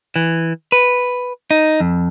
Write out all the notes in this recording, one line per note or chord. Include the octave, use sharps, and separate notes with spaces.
E3
B4
D#4
F2